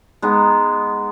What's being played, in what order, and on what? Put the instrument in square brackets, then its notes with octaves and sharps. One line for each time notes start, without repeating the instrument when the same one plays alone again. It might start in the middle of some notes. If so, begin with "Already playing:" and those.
[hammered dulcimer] G#3 B3 D#4